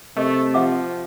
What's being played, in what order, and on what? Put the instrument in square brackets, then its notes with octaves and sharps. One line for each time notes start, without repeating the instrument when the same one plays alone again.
[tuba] C3 [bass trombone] A3 [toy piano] A#4 D#5 C#6
[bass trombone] F3 [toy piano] E5 F#5 D6